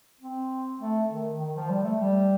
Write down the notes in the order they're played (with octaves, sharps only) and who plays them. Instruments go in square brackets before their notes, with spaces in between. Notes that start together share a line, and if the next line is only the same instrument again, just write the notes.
[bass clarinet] C4
A3
D#3
D#3
F3
G3
A3
G3